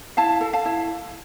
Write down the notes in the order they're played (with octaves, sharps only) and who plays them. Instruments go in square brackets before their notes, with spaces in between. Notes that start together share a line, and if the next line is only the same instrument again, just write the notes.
[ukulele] E4 F5 A5
A4
F5 A5
E4